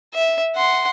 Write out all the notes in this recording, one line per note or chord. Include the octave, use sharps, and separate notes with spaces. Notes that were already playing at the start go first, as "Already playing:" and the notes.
E5
F#5 C6